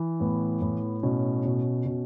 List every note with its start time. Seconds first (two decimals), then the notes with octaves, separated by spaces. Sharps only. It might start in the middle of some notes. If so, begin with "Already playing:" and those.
Already playing: E3
0.20 A2 B3
0.62 A2
1.03 B2 C#4
1.45 B2
1.86 B2